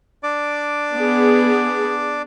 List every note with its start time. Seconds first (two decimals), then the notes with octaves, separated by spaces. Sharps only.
0.23 D4 D5 D6
0.95 B3 G#4